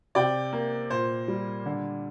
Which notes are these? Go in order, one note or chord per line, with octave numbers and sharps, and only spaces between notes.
C3 D5 G5
A#3
A#2 C5
G3
D3